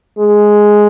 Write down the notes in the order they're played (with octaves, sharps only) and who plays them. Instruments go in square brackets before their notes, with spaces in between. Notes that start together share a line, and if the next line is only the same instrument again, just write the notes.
[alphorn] G#3